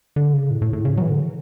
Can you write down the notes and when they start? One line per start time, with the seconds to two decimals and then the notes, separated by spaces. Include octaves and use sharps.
0.16 D3
0.33 C#3
0.51 A2
0.62 A2
0.73 A2
0.85 C#3
0.97 F#3
1.02 E3
1.10 D3